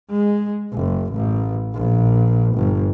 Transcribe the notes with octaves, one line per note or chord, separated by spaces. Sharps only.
G#3
F#1
A1
A#1
G1